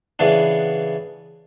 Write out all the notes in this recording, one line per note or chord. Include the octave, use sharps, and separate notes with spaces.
C#3 E3 B3 D4